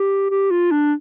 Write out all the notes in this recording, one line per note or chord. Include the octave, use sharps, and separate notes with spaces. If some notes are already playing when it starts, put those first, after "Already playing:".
Already playing: G4
G4
F4
D4